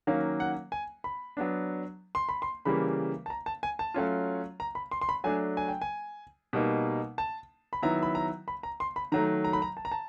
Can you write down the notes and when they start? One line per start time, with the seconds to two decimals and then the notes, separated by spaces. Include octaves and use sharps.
0.07 D#3 F#3 A#3 C#4 F5
0.40 F#5
0.72 G#5
1.04 B5
1.37 F#3 B3 D4
2.15 C6
2.29 B5
2.42 C6
2.65 C#3 E3 G3 A#3 B5
3.26 A5
3.30 A#5
3.46 A5
3.63 G#5
3.79 A5
3.94 F#3 A3 C#4 F4
4.60 A#5
4.75 B5
4.91 C6
5.01 C6
5.09 B5
5.24 F#3 A3 D4 G#5
5.57 G#5
5.68 G5
5.82 G#5
6.53 B2 G3 A#3 D#4
7.18 A5
7.73 B5
7.83 D#3 F#3 B3 E4 A#5
8.03 B5
8.15 A#5
8.48 B5
8.63 A#5
8.80 C6
8.96 B5
9.12 D#3 F#3 A3 A#5
9.44 A#5
9.53 B5
9.62 A#5
9.77 A5
9.85 A#5
9.92 A5